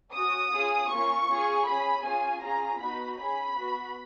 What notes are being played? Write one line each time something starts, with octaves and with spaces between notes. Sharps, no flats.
C#4 F#4 D#6
C#4 F4 G#4
A#3 C#4 F4 C#6
C#4 F4 G#4
C#4 G#4 B5
C#4 F4 G#4 G#5
C#4 F4 G#4 A#5
B3 D#4 F#4 B5
C#4 G#4 B5
B3 F#4